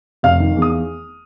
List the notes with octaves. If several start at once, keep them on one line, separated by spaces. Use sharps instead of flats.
F1 F5 F6
D#3
E2
D#6